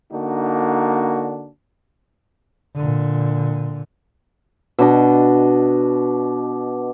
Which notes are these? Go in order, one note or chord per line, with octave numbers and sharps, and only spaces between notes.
D3 A#3 D4 D#4 F#4
A#2 D3
B2 D4 D#5